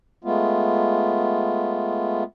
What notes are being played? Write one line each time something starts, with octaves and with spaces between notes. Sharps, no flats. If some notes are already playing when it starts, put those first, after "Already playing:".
G#3 A3 B3 F4